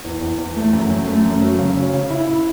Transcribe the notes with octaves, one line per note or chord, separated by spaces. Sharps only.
E2
E2
E2
A3
F#2
F#2
A3
F#2
F#3
C#3
C#4
C#3
E4
E4